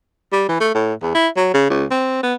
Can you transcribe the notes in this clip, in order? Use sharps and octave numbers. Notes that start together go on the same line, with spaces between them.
G3
E3
A3
A2
E2
E4
F#3
C#3
C#2
C4
B3